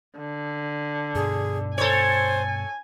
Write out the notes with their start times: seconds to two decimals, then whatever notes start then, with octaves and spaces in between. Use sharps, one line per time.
0.20 D3
1.15 G2 B2 G#4
1.78 A4 C5 C#5 G#5